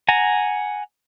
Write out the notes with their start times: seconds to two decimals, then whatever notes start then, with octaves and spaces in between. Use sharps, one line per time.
0.08 F#5 G#5 A#5